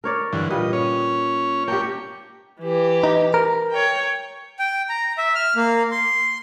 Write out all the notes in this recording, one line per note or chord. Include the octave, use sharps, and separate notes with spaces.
A#4 C#5 D5
G2 D3 E3
A#2 G3 B4 D#5
C#4 C#5
A#3 D4 G4 G5 C#6
E3 G4
D#4
A#4
C#5 G5
G5
A#5
E5
F6
A#3
C6